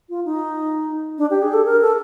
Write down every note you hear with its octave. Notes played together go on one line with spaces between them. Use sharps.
F4
D#4
D4
G4
G#4
A4
A#4
A4